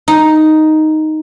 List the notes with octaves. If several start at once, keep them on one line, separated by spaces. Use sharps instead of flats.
D#4